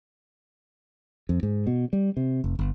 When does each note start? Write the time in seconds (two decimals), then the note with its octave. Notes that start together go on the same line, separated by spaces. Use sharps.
1.29 F2
1.43 G#2
1.67 B2
1.93 G3
2.17 C3
2.44 F1
2.59 G1